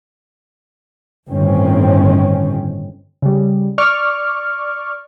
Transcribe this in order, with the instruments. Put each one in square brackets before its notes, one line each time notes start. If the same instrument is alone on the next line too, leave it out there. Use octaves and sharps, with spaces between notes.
[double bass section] G1 A2 D#3 C4 C#4
[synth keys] C#3 G3
D5 C#6 D6 F6